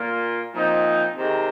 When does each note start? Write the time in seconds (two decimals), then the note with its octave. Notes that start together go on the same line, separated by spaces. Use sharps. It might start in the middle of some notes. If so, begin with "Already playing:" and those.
Already playing: A#2 A#3 F4
0.54 A#2 F3 C4 D#4
1.17 C3 D#3 G#3